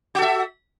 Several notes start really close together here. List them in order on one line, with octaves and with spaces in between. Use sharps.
F#4 A4 E5